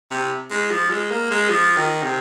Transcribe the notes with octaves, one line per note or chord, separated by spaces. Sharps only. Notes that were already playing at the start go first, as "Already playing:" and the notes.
C3
G#3
F3
G#3
A#3
G#3
F3
D#3
C3